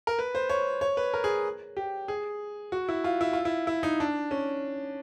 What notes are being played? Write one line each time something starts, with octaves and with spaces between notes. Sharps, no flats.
A#4
B4
C5
C#5
C#5
B4
A#4
G#4
G4
G#4
F#4
E4
F4
E4
F4
E4
E4
D#4
D4
C#4